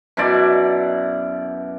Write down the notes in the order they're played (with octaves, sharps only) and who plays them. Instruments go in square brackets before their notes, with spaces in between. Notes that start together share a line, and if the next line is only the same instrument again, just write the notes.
[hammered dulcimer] F#2 B2 E4 D5